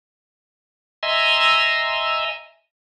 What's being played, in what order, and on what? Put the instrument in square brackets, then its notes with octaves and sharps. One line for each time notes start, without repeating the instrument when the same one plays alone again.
[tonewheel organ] D#5 E5 G#5 A#5 C6 E6